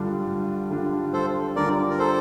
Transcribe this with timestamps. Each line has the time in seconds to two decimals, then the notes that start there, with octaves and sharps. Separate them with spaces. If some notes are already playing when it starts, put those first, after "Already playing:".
Already playing: G2 D3 G3 D4 F4
0.27 G2
0.70 D3 G3 D4 F4
1.13 G2 A4 C5
1.56 D3 G3 D4 F4 A#4 D5
1.90 A#4
1.99 A4 C5